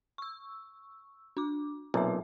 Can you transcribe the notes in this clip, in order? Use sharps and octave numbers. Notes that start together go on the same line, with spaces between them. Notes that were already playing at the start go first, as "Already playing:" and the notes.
C#6 E6
D4 D6
B1 A#2 C4 E5